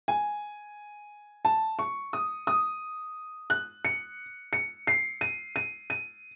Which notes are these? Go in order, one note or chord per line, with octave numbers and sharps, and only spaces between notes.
G#5
A5
C#6
D#6
D#6
F#6
C#7
C#7
C7
D#7
D#7
D#7